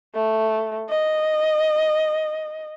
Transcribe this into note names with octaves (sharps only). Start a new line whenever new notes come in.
A3
D#5